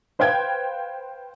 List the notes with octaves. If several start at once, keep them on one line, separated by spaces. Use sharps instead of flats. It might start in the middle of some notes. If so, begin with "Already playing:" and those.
B4 C5 F5 G5 G#6